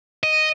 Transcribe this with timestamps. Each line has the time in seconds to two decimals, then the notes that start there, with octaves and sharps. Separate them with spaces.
0.23 D#5